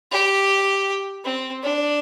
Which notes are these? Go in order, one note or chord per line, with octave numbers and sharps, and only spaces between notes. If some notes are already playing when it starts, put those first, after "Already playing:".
G4
C4
D4